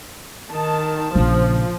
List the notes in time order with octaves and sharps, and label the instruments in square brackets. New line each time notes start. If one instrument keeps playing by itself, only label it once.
[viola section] D#3 A5
[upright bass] A#1 C#3 [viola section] F3